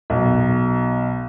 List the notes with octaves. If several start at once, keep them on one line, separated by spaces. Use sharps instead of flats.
B1